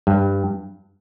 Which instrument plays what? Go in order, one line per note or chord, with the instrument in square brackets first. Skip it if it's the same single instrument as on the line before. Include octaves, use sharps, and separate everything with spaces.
[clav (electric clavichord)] G2